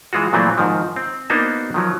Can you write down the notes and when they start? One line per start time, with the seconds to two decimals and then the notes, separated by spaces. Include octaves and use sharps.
0.13 E3 G#3 F4 F#4
0.33 A#2 E3 F#3 A3 C4
0.58 G#2 D#3 F3
0.96 C4
1.30 A#3 B3 D4 D#4 F#4 C5
1.74 D#3 F3 F#3